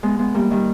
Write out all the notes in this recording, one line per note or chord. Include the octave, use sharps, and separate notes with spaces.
G#3 B3
G#3 B3
G3 A#3
D#3 G3